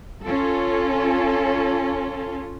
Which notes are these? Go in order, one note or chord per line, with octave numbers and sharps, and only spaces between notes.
C#4 F4 A4